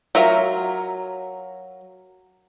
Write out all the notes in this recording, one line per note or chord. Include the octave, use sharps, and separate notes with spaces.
F#3 F4 A#4 E5